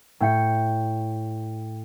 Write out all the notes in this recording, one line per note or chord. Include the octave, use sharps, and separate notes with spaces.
A2 G5 C#7